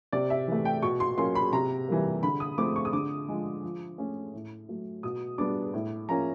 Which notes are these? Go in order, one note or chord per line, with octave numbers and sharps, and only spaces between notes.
C3 D5
E5
E3 A3
G5
B2 C#6
C6
F#3 A#3 C#4 C6
B5
C3 A#5
E3 G3 A#3
D3 B5
D#6
F3 A3 C4 D6
C#6
D#6
D3 D6
F3 G#3
F3
A3 C#4
A2
F#3 A3
B2 D#6
G3 B3 D4 D6
A2
F3 A#3 C#4 A#5